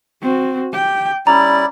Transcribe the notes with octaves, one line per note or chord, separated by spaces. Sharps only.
C4 F#4
G4 G5
G3 C#4 E4 D5 A#5